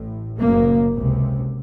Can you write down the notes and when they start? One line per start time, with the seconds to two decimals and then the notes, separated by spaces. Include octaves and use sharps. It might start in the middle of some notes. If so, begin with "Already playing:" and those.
Already playing: A1 A2
0.40 F#1 F#2 C#3 A#3
0.95 C#2 C3